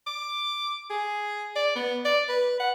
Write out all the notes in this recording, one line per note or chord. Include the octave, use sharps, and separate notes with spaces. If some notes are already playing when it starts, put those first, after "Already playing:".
D6
G#4
D5
B3
D5
B4
F#5